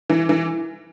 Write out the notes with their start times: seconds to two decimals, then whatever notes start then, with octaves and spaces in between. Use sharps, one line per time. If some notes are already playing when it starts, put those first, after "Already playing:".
0.10 E3
0.29 E3